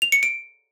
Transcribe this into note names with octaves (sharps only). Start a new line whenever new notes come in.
F7
C#7
D7